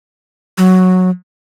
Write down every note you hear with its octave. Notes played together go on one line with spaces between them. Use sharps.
F#3